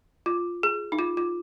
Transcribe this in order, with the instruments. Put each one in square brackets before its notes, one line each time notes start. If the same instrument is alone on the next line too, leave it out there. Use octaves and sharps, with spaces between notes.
[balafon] F4
G#4
D#4
F4
F4